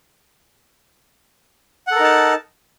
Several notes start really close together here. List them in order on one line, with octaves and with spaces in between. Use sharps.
F#5 A4 A#4 D#4 A5